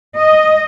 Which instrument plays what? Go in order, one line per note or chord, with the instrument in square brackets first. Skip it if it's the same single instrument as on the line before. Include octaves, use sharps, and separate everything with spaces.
[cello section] D#5